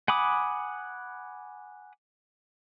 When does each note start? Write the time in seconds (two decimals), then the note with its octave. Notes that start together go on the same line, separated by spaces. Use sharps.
0.08 F#5 G#5 B5 D6 D#6